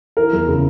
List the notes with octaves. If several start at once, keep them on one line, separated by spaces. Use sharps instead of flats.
E3 A#4
E2
C#3